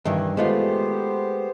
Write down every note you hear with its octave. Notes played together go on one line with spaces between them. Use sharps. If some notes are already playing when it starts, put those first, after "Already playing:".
G2 D#3 E3
G#3 A3 B3 F4 G4 C5